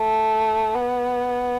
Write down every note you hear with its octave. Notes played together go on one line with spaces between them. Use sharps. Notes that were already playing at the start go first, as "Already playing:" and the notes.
Already playing: A3
B3